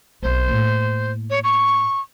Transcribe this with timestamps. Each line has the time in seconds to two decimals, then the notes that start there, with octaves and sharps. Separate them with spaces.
0.23 B1 C4 C5
0.48 A2 A#3
1.30 C#5
1.44 C#6